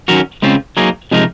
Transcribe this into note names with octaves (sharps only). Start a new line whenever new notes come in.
D#3 F#3 C#4 F#4 A#4
C#3 G#3 C4 F4
F#3 A#3 D#4 G#4
C3 F3 G#3 D#4 A#4